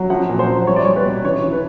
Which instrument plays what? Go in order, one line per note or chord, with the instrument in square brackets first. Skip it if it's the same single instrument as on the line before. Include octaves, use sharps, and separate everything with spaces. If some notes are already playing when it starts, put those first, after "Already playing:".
Already playing: [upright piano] F#3
F3 F#5
A#2
C5
F3
G3 C#5
D5
G3 C#5
B4
B2
E3 C#5
E3
B4